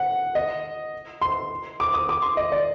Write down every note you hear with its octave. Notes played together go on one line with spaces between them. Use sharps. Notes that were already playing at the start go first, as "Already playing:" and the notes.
Already playing: F#5
D#5
C6
D6
D#6
D6
C6
D#5
D5